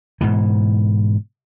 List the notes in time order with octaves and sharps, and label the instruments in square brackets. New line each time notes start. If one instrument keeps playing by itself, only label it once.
[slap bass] G#2 B2 E3